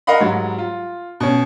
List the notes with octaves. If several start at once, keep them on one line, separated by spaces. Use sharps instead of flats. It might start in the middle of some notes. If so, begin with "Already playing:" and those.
A#4 D#5 F5 F#5 B5
G#2 F#3 G3
F4
B2 C#4